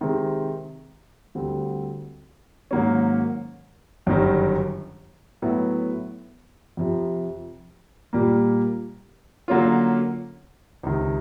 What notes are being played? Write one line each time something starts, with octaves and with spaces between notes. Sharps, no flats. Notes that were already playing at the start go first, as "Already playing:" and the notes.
C3 D#3 G#3 C4
D2 D3 G3 C4
G#2 D#3 F#3 A#3 C#4
G1 F#2 D#3 G3
A2 F#3 B3 E4
F2 C3 F3
A#2 G3 A#3
D3 F#3 A#3 C#4 F4
C#2 C3 D#3